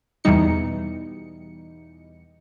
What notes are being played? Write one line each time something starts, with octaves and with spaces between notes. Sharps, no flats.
E2 B2 E3 G3 D#4 C#7